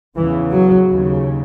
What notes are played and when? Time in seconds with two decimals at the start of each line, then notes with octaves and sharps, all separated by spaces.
0.16 E2 C#3 E3
0.52 F#3
0.87 D#2 C#3